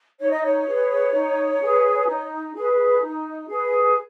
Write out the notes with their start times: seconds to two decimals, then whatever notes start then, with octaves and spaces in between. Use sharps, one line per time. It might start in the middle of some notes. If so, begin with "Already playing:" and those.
0.19 D#4 C#5
0.30 D#5
0.42 C#5
0.67 G#4 B4
1.13 D#4
1.61 G#4 B4
2.07 D#4
2.54 G#4 B4
3.01 D#4
3.48 G#4 B4